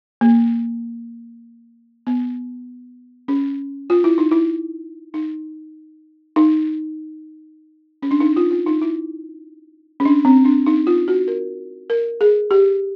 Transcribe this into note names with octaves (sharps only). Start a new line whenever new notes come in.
A#3
B3
C#4
F4
E4
D#4
E4
D#4
D#4
C#4
D4
D#4
F4
F4
D#4
E4
C#4
D4
C4
D4
D#4
F4
F#4
A#4
A#4
G#4
G4